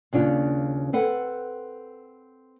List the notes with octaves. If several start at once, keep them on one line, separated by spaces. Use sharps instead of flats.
D#2 C#3 D4 F4
C4 A4 B4 F#5